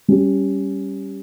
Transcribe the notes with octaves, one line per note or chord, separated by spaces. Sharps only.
G3 C#4 G4